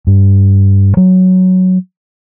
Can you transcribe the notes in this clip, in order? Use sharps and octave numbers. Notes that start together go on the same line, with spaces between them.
G2
F#3